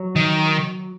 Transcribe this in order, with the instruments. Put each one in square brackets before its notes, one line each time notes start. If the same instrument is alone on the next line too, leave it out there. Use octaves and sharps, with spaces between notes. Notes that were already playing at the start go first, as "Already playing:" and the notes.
Already playing: [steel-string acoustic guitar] F#3
[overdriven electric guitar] D#3